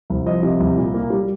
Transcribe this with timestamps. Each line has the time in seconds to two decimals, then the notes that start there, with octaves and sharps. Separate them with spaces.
0.10 C2
0.26 F3 D#5
0.43 C3
0.60 C2
0.77 A#2
0.94 A#3
1.10 G3